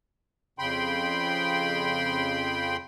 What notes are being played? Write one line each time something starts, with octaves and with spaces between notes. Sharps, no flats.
F2 C#3 G5 B5 C6